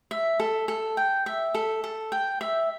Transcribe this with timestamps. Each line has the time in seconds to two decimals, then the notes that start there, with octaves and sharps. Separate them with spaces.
0.11 E5
0.40 A4
0.68 A4
0.97 G5
1.26 E5
1.54 A4
1.84 A4
2.12 G5
2.41 E5